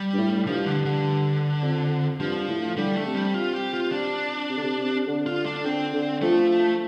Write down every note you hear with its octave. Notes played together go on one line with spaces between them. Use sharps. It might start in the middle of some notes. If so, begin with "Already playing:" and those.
Already playing: G3
G2
A2
G2 F3
D3
D3
F2
G2 F3
A2
D3 G3
A3
C3
G3
F4
G4
F4
D4
C3
D3
C3
C3
D3
F4
D4
D3 C4
D3
F3 A3